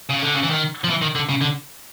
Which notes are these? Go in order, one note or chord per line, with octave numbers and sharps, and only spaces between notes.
C#3
D3
C#3
E3
D#3
F3
E3
D#3
D3
C#3
D3